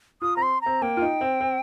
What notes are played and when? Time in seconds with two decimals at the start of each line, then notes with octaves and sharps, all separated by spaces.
0.22 F4 D#6
0.36 C4 A#5
0.42 C6
0.61 C4 A#5
0.82 A#3 G5
0.97 F4
1.02 D#4
1.21 C4
1.40 C4